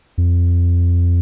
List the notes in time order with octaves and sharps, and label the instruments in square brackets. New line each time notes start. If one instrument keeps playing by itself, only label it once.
[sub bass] F2